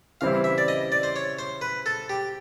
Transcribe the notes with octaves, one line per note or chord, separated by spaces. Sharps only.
C#3 E3 G3 C4 E4 F5
E5
D5
D#5
D5
C5
C#5
C5
B4
A4
G4